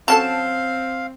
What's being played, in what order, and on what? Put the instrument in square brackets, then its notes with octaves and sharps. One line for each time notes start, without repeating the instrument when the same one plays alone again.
[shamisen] F#3 C#4 A4 [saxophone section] C4 [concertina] F5 [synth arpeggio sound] A5